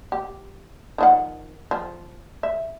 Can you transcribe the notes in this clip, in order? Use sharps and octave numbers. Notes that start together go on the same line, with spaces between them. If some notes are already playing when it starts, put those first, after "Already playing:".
G4
D#3 F3 F#5
F3
E5